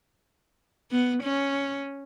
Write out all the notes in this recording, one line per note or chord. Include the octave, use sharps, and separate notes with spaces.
B3
C#4